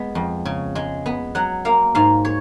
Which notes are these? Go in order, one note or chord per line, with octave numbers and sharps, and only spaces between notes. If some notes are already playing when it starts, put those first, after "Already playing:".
Already playing: G#3 B3
F2
C#3
G#3
B3
F#3 F#5
A#3 F5
G#2 F5
C#5